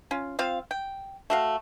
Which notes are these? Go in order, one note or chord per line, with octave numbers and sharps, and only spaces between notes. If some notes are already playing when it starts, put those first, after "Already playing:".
C#4 F4
C4 F4 F5
G5
A3 F#4 F5